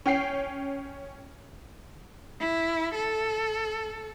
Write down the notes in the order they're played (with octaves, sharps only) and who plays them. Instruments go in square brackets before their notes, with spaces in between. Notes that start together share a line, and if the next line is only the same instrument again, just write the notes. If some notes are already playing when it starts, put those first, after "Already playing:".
[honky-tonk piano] C#4 G5 C7
[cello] E4
A4